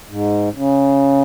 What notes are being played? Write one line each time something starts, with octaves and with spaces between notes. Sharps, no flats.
G#2
C#3